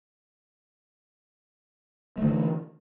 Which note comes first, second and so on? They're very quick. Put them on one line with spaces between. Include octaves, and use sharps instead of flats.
A3 D3 E3